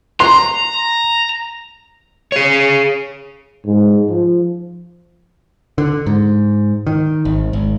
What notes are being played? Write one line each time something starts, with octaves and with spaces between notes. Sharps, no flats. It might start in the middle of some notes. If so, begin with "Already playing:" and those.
A#5 C6
G#4 C#5
G#2
F3
D3
G#2
D#3
G#1
G#1